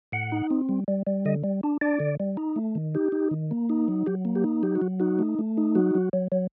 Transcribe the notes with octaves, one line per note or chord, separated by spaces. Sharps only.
A2 F#5
D#4
C4
G3
G3
G3
D3 D#5
G3
D4
D4 D5
D3
G3
D#4
A3
D#3
D#4 G4
D#4
D#3
A#3
D#4
F#3
F#3 G4
A#3
G4
D#4
F#3 G4
F#4
F#3
D#4 F#4
A3
A3
D#4
F#3 F#4
F#3
F#3
F#3